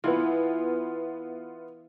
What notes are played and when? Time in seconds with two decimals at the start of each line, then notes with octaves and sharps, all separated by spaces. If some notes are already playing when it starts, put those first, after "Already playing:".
0.04 E3 B3 E4 F4